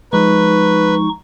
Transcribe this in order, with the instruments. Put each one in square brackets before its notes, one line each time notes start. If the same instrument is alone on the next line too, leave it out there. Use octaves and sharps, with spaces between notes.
[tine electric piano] F3 G#3 [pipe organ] D#4 C#6 [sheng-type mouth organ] B4